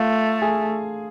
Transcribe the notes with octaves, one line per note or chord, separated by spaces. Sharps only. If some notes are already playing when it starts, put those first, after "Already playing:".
Already playing: A3 F4 F5
G#4 G#5